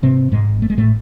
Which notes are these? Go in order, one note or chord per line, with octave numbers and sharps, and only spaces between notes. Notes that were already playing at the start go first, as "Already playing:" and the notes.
G#2 C3 C4
G#2 G#3
G#1
A3
G#3
A2 A3